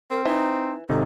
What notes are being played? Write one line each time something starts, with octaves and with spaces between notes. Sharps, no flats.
C4 A#4
E3 D#4
G#1 C3 D#4 A4